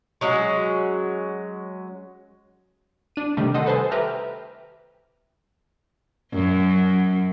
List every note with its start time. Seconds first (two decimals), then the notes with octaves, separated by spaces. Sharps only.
0.21 F#3 G#3 C#4 F#4
3.16 D4 D#7
3.37 C3 D#3 G3 A3 G4
3.54 A4 D#5 F#5 C6 D#6 G6
3.66 A4 B4 C5 G#5 A5
3.92 G4 B4 E5 A#5 F6
6.33 F#2